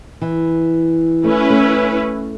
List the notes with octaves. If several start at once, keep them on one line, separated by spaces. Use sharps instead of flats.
E3
A3 C#4 E4 B4
A3